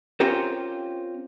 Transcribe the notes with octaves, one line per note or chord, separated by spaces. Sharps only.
C4 C#4 F4 G4 A#4 C5